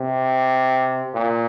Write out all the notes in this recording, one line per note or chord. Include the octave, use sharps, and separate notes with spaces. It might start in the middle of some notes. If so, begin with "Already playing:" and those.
Already playing: C3
A#2